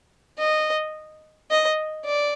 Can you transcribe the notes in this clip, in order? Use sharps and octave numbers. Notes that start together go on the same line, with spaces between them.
D#5
D#5
D5